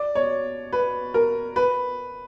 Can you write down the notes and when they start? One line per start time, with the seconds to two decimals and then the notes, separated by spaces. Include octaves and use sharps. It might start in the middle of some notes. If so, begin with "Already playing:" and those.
Already playing: D5
0.15 C#5
0.73 B4
1.14 A#4
1.56 B4